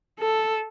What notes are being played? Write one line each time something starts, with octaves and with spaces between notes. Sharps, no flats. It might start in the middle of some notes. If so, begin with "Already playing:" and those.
A4